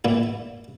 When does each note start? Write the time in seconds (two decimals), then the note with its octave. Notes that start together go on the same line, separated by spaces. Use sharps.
0.05 A#2 E4